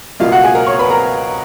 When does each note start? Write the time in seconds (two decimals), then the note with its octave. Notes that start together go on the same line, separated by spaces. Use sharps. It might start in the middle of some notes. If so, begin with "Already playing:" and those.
0.20 C#2 B2 A#3 F4 F5
0.32 F#4 F#5
0.43 G#4 G#5
0.55 A#4 A#5
0.67 C#5 C#6
0.79 B4 B5
0.90 A#4 A#5